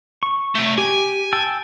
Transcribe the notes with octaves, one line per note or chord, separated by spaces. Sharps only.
C#6
C3 A3
G4 G#5
G5 A5 E6